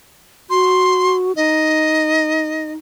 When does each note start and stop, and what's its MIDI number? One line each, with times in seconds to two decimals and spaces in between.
0.50 1.36 66
0.50 1.16 84
1.36 2.76 63
1.36 2.71 75